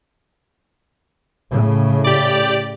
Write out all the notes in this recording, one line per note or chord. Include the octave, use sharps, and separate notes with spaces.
A2 C#3
G4 D5